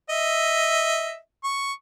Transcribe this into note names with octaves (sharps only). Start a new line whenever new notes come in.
D#5 E5
C#6